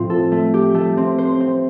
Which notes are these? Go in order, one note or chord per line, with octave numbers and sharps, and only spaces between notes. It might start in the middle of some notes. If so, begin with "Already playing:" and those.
Already playing: A2 F3 C4
A4
A3
G4
A3
C4
C5
C4